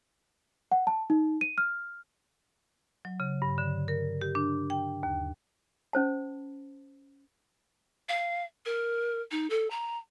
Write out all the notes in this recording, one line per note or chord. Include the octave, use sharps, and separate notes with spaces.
F#5
A5
D#4
D#7
F6
F#3
C#3
G2
D3
A#4
G4
D4
G5
D#2
C#4 C5 A5
F5
A#4
D#4
A4
A#5